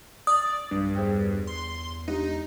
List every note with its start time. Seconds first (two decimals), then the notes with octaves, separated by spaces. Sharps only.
0.27 D5 D#6
0.71 B1 G2
0.95 E2 G#4 C5 G5
1.47 C6
2.08 G#3 D4 D#4 G4